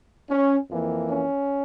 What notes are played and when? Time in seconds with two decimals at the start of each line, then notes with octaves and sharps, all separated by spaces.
0.29 C#4
0.69 F2 E3 A#3
1.08 C#4